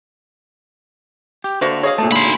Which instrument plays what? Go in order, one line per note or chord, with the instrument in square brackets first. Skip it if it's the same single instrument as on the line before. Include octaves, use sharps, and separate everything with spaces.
[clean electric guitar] G4
[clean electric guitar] D3 [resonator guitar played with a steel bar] A3 A#3 F#4 [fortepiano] C5
[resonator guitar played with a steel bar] G#4 D#5 F5 [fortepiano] C#5
[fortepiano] A#2 A5 [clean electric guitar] A3
[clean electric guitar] D2 C6 [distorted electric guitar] D#4 B5